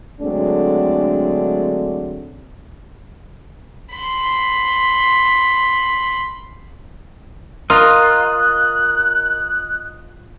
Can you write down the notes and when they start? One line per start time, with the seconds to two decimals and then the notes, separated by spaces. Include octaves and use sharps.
0.21 D3 F#3 G#3 A3 C4 D4
3.91 B5 C6
7.70 F4 A#4 D#5 A#5 F#6